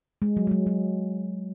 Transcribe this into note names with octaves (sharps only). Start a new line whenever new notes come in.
G#3
F#3
G#3
F#3
F#3